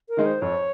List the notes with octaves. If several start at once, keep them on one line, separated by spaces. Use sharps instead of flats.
A#4
D#3 G#3 D#4
C5
F2 C#5